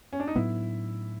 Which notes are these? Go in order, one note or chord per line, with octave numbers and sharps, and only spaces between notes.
C#4
D4
D#4
A2 F#3 B3 D4 E4